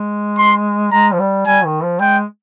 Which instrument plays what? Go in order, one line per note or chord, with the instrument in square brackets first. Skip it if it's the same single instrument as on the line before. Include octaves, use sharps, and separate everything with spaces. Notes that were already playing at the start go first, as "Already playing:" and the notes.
Already playing: [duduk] G#3
[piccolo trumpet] C6
[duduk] G#3 [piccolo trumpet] A#5
[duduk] F3
G3
[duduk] G3 [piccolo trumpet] G#5
[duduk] D#3
F3
[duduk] G#3 [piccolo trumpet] G5